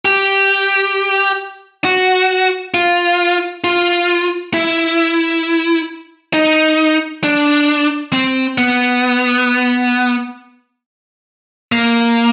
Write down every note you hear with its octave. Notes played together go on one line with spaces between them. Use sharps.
G4
F#4
F4
F4
E4
D#4
D4
C4
B3
A#3